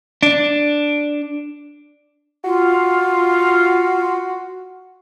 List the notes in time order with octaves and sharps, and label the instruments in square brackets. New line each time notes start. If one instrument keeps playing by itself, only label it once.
[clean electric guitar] D4
[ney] F4 [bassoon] F#4